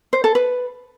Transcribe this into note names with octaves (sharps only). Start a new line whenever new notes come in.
C5
A4
B4